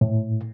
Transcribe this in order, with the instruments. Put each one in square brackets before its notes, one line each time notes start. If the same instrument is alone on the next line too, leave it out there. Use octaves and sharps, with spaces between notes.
[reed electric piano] A2